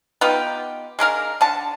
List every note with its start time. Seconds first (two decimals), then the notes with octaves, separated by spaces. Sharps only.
0.21 B3 D#4 F4 G4
0.99 G#3 D4 A#4 F5
1.41 D3 A5